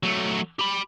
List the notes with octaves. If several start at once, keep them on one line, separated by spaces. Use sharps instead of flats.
F#3 A3
G4 B5